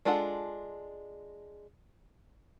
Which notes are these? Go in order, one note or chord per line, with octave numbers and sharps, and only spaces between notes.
G#3 D4 F4 A4 F#5